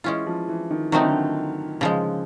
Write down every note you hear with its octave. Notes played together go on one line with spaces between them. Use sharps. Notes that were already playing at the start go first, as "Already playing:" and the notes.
E3 G#3 C#4 F4
F3
E3
D#3
D#3 F#3 A3 C4 D#4
D3
D#3
C#3 F3 G#3